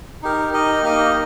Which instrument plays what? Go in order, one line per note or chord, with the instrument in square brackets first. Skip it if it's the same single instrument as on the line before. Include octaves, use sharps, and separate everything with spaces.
[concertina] D#4 G4 A#4
D#4 G4 A#4 D#5
A#3 D#4 G4 A#4 D#5